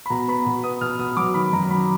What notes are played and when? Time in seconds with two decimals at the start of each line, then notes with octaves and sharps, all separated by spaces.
0.06 B5
0.10 B2 A#5
0.28 B3 B5
0.46 B2
0.63 B3 D#6
0.81 B2 F6
0.99 B2 D#6
1.17 F#3 D6
1.34 D#3 B5
1.53 F#2 A#5
1.70 F#3 B5